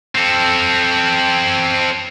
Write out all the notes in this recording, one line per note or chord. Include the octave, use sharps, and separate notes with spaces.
C4 A4